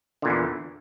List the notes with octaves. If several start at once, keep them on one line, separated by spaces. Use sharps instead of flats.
E2 A#2 D3 E3